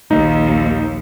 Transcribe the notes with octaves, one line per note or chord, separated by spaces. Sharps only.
A#1 D#2 D#4